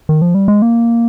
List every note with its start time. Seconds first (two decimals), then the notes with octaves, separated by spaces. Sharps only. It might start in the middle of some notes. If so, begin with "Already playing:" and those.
0.09 D#3
0.22 F3
0.35 G3
0.48 G#3
0.62 A#3